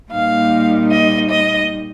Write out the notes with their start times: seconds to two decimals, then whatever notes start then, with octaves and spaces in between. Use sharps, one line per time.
0.10 A#2 G3 A#3 D#4 F5
0.90 D#5
1.29 D#5